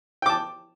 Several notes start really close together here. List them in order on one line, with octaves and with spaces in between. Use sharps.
G5 D6 A5